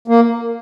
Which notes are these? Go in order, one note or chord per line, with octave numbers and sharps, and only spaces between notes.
A#3